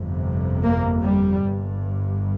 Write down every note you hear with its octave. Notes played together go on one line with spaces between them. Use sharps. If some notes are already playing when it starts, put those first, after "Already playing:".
Already playing: G1 F2 C3
A#3
G3
G1 G2